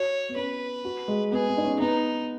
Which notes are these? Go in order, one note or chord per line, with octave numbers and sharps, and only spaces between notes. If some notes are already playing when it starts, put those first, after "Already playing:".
Already playing: F#4 C#5
B3
C#4 B4
F#4
G#3
B3 G#4
B3
D#4
C#4
B3 D#4